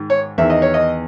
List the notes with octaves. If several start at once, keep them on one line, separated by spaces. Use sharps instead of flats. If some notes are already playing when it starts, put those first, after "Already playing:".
Already playing: G#2 D#3
C#5
E2 D#3 E5
D#5
C#5
D#5